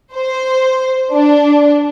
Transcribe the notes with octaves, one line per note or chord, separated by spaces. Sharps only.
C5
D4